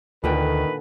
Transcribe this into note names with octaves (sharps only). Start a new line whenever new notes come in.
D2 A#2 D3 D#3 B4 G5